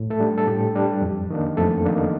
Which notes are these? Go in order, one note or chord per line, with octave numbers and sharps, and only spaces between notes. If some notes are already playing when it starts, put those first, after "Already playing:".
Already playing: A2
A3 A4
G3 D4
A4
A2 G4
G3 D4
F2
D#3 A#3 D4
F2 A3 A4
D#3 A#3 D4